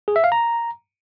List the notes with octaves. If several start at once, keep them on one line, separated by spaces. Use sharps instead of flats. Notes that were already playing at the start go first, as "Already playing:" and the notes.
G#4
E5
F5
A#5